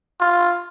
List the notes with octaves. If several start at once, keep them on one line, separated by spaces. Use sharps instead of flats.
F4